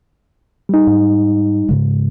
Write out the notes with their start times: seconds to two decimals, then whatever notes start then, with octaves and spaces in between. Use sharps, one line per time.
0.69 G3 D#4
0.87 G#2
1.69 G#2 C#3 G#3